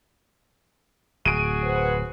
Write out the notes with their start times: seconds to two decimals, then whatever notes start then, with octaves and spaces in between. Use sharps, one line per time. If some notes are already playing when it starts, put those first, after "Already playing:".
1.26 D1 F#4 G#4 D7 D#7
1.64 B4 C5 F#5